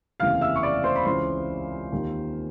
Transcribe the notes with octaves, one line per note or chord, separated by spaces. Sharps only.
F1 D#2 C#3 E3 F5 F6
E5 E6
C#6
D5 D6
C5 C6
B5
C#2 C#3 E3 C5 C6
D#2 D#3